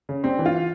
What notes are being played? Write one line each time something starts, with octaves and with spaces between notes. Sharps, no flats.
C#3
G3 C4
E3
F4